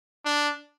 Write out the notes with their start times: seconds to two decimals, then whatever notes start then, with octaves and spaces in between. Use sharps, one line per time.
0.25 D4